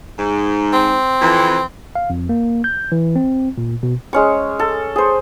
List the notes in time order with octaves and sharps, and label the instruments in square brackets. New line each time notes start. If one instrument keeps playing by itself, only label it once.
[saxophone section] G#2
[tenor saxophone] C4
[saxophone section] F2 E3
[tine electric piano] F5
F2
A#3
G6
E3
C4
A#2
B2
[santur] G#3 C#4 C#6
A4
G#4 C5